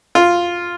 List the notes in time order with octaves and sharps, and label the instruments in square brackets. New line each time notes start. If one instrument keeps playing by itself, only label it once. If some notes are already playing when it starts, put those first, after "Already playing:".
[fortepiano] F4